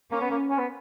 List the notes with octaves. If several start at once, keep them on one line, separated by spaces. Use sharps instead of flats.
A#3 C#4
B3
A#3
C#4
B3